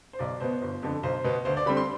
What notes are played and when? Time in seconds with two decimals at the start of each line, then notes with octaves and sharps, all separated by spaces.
0.13 C5
0.19 B1 D5
0.40 B2 B3 C5
0.62 G1
0.83 F2 D3
1.03 B1 C5
1.24 B2 B3
1.45 D2 C5
1.57 D5
1.66 D3 G3 C4 B5
1.77 C6